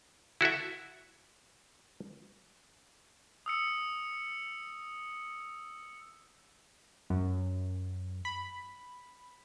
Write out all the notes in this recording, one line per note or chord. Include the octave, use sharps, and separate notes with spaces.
E4 F#4 A4 E5
D#6 E6 C#7
F#2
B5